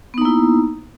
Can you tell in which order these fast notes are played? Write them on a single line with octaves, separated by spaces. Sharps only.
B3 D#4 A#3 E4